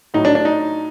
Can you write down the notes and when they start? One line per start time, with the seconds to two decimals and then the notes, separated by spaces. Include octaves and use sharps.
0.14 A2 F#3 D#4
0.25 D4
0.35 D4
0.45 D#4